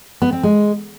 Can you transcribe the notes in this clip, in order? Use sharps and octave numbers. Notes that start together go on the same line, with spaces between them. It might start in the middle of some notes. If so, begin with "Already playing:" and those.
B3
C4
G#3